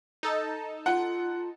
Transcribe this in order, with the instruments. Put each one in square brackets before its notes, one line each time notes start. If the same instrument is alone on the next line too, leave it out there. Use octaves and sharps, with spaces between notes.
[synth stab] D#4 A4 A5
[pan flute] F4 [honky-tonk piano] F#5